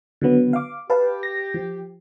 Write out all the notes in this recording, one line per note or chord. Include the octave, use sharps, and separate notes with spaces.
D3 F#3 B3
F5 D6
G4 B4 F5 A5
A#6
F3